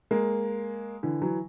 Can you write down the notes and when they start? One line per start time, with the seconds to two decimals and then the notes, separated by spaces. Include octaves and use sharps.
0.11 G#3 A#3
1.03 D3 E3
1.22 E3 F#3